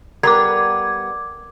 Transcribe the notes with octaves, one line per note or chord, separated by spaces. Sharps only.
G3 B3 A4 A#4 A#5 D6 G#6